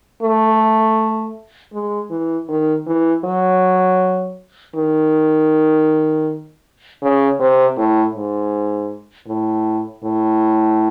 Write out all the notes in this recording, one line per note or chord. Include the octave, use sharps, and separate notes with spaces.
A3
G#3
E3
D#3
E3
F#3
D#3
C#3
C3
A2
G#2
A2
A2